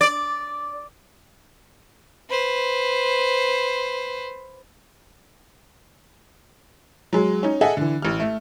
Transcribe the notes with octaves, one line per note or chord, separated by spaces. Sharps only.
D5
B4 C5
F#3 G#3
C#4 D#4
G#4 A4 D#5 E5 F#5 G#5
D3 E3
A1 F6
A3